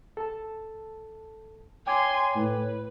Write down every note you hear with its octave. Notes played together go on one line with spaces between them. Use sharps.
A4 A5
C#5 G5 G#5 C6 D6 G#6
A2 B4